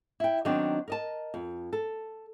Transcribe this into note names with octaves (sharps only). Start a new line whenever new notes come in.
E4 G5
D#3 F#3 B3 C4 D4 D#4
A#4 D#5 A5
F2
A4